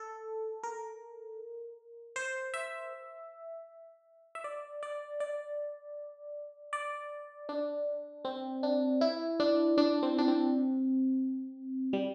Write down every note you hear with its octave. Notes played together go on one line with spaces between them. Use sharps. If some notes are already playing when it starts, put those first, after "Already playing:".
Already playing: A4
A#4
C5
E5
E5
D5
D5
D5
D5
D4
C4
D4
E4
D4
D4
C4
D4
C4
G3